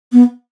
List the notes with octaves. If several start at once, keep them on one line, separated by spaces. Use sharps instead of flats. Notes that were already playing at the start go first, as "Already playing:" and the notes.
B3